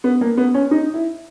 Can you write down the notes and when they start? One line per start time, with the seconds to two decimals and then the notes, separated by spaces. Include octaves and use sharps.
0.04 B3
0.21 A#3
0.37 B3
0.54 C#4
0.71 D#4
0.94 E4